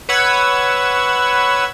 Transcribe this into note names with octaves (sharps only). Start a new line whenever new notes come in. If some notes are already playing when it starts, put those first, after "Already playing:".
B4 C#5 F#5 E6 G#6